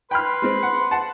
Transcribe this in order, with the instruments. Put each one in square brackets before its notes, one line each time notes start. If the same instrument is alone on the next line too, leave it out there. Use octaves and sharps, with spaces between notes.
[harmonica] B4 C6 [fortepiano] G5 B5 F6
[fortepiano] G#3 C4
F#5
F#5 A5